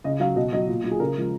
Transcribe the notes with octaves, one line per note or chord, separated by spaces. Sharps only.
C#3 D#5
F#3 F5
B2 D#5
F#3 D#5
A#2
F#3
G#4
C#3 A#4
F3 G#3